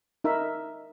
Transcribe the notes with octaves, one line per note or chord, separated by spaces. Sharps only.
D#4 A#4 E5 B5